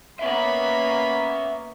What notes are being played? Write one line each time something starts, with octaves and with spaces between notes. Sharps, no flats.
A#3 B3 C#4 E5 B5